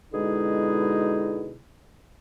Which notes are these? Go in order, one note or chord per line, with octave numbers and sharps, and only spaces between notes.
B2 D3 G#3 D#4 E4 G#4